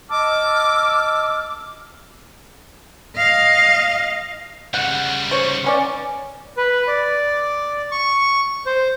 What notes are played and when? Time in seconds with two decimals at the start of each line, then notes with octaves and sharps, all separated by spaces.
0.11 D#5 A5 D6 E6 F6
3.16 D#5 F5
4.74 C#3 G3 F#5
5.31 C5 C#5
5.64 B3 C#4 D5
6.57 B4
6.87 D5
7.91 C#6
8.66 C5